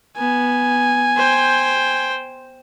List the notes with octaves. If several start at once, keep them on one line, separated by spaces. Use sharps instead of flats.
B3 G#5
C5 G5